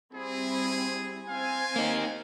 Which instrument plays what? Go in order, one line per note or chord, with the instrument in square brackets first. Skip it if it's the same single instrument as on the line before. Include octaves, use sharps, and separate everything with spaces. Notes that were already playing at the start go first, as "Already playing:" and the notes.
[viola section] G3 C4 E4 [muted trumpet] G#4
[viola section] C4 G#5 [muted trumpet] F5
[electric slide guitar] A#3 D#4